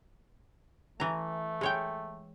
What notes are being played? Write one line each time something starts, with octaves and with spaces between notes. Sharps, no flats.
E3 A3 A#5
G#3 C#5 G5